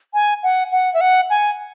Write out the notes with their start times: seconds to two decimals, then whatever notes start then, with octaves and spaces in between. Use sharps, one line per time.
0.14 G#5
0.43 F#5
0.72 F#5
0.94 E5
1.01 F#5
1.30 G#5